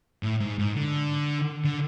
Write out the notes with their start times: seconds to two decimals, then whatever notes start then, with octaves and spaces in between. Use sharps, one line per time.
0.23 A2
0.40 G#2
0.58 G#2
0.76 D3
1.64 D3